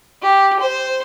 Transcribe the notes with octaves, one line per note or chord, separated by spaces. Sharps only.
G4
C5